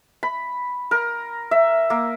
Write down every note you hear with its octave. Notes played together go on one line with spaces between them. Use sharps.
B5
A#4
E5
A#3